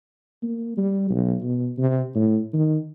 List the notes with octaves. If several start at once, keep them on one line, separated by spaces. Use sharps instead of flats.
A#3
G3
B1
B2
C3
A2
D#3